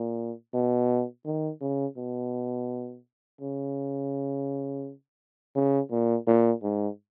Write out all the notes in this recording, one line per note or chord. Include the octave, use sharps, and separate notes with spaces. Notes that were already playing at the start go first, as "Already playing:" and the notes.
Already playing: A#2
B2
D#3
C#3
B2
C#3
C#3
A#2
A#2
G#2